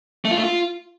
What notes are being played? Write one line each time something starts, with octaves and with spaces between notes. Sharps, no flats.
A3
F4
A3
F4